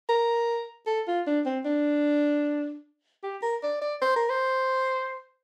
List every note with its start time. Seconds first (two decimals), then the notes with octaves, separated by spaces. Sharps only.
0.09 A#4
0.87 A4
1.07 F4
1.27 D4
1.46 C4
1.65 D4
3.24 G4
3.42 A#4
3.63 D5
3.81 D5
4.02 C5
4.16 A#4
4.30 C5